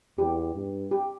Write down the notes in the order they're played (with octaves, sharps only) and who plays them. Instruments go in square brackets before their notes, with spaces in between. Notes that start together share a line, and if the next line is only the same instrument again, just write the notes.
[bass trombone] E2 [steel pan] G4
[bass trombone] G2
[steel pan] G4